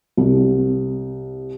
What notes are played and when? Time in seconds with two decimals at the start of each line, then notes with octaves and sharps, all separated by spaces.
0.17 C2